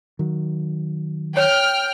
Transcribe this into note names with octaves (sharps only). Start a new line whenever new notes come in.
D#3 F#3
C#5 G5 F6